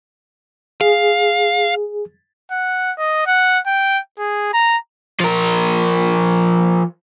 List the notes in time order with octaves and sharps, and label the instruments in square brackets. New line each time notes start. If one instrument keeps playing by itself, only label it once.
[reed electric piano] G#4 [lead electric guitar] F5
[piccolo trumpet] F#5
D#5
F#5
G5
G#4
A#5
[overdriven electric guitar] F3 A#4